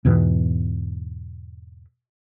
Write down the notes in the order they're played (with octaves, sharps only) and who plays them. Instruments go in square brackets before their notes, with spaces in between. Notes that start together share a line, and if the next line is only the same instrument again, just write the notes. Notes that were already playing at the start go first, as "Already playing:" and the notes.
[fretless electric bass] E2 G#2 B2 E3